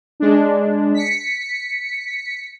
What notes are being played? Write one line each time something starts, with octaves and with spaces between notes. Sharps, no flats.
G#3 D4
B6 C#7